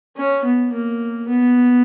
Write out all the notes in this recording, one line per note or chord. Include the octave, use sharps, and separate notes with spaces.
C#4
B3
A#3
B3